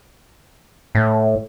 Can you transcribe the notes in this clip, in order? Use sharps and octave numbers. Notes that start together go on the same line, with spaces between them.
A2